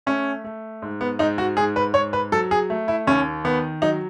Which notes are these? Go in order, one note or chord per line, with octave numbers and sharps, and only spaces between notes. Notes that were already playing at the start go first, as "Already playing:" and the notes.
A3 C#4
A3
G#2
B3
G#2 D#4
F#4
G#2 G#4
B4
G#2 C#5
B4
F#3 A4
G#4
A3
E4
D#2 C#4
D#3 B3
F#3 D#4